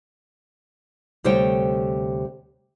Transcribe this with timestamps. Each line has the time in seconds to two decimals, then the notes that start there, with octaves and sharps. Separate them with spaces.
1.24 D2 C3 G3 C5 C#5 G5